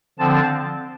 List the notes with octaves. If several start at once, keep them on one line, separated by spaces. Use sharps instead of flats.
D3 F3 C4 A5